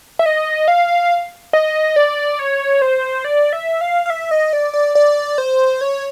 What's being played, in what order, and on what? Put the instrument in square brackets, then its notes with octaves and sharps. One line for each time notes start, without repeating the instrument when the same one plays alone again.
[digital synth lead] E5
D#5
F5
D#5
D5
C#5
C5
D5
E5
F5
F5
E5
D#5
D5
D5
D5
C5
C#5